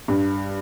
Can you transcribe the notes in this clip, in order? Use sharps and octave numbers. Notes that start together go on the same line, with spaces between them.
G2